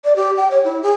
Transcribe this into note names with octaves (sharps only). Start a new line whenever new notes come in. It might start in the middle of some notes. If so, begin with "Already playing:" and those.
D5
G4
G5
C#5
E4
G#4